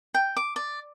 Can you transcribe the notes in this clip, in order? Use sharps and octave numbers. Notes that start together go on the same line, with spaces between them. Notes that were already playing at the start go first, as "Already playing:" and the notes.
G5
D6
D5